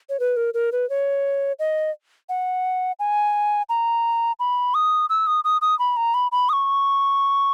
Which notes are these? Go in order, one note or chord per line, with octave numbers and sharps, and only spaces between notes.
C#5
B4
A#4
A#4
B4
C#5
D#5
F#5
G#5
A#5
B5
D#6
E6
D#6
D#6
D#6
B5
A#5
B5
B5
D#6
C#6